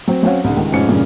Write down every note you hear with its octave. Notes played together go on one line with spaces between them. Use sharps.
F#3 C4
F#3 C4 C#4 C#5 F5 F#5
C2 D3
C#2 D#3
F1 G#2 F3 C#4 C#7
G2 A#2 C#3 E3